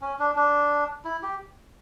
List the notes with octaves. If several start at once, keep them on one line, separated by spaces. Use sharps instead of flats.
C#4
D4
D4
E4
G4